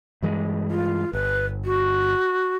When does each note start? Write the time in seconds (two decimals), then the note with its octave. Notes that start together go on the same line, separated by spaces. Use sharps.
0.23 G2 E3 G#3
0.71 F4
1.13 G1 B4
1.65 F#4